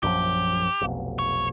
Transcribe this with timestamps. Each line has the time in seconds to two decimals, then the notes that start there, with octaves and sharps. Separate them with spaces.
0.03 A#1 F#2 F3 G4
0.81 F1 B1
1.19 C#5